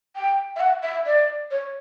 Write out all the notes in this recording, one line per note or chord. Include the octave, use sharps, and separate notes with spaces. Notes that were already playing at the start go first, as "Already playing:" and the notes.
G5
E5
F#5
E5
D5
C#5